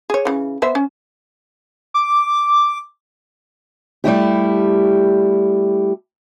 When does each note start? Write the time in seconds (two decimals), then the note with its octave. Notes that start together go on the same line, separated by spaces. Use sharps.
0.10 G#4 C#5
0.25 C#3 E3
0.62 B3 C5 E5
0.75 C#4
1.94 D6
4.04 G3 A3 E4 G4